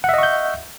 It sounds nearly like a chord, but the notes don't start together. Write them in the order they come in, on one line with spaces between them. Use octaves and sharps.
F#5 E5 D#5 C#6 G6